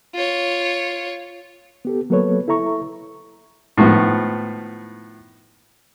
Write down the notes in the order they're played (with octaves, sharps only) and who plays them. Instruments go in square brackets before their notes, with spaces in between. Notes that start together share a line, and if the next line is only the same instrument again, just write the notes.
[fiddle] F4 C#5
[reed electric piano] B3 G4 A4
F#3 A#3 B3 A4 B4 C#5
E4 A4 E5 A#5 C#6
[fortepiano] A2 D#3 F3 B3